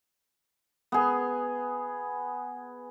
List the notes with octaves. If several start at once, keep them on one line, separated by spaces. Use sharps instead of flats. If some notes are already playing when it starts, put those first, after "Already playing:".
B3 G#4